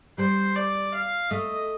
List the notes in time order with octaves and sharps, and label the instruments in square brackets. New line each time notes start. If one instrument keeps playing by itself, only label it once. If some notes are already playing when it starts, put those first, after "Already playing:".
[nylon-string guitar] G3 [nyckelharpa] C5
[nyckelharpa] D5
F5
[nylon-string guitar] A3 [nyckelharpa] D#5